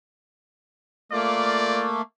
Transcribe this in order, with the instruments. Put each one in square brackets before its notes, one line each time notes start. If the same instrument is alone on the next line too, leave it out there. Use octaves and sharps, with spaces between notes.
[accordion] A3 A#3 [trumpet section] F4 D5